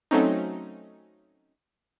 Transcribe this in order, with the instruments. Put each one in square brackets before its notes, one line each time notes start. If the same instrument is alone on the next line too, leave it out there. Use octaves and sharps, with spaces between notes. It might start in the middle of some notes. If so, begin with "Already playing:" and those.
[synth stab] F#3 A3 C4 C#4 D#4